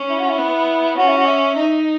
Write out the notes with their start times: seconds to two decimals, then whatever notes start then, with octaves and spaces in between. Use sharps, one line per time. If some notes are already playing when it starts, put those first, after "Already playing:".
Already playing: C#4
0.09 E4
0.19 F#4
0.29 E4
0.38 B3
0.97 C#4 F#4
1.07 E4
1.17 F#4
1.27 E5
1.56 D#4